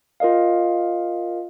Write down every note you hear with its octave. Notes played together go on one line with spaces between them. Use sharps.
F4 A#4 D#5 F5